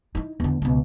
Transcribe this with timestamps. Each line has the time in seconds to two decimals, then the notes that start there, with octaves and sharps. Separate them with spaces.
0.15 D#4 E4
0.40 E2 D3
0.62 C#2 B2